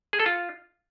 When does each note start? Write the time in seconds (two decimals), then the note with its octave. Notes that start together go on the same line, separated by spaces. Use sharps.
0.13 G#4
0.20 A4
0.26 F4